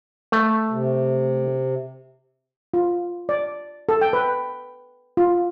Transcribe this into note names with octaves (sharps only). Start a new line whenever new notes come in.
A3
C3
F4
D5
A4
G5
B4
F4